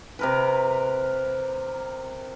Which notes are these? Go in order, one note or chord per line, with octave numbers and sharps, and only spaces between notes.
C3 A#4 B4